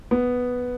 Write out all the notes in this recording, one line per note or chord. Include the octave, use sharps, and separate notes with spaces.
B3